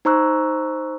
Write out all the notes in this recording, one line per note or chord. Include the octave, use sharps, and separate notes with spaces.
D#4 C5 A#5 C#6 E6 F#6